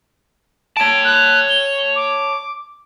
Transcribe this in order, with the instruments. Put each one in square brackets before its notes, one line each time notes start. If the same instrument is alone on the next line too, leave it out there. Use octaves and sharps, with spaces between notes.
[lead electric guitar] C#5 A5 [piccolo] D7
[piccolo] F#6
G7
D6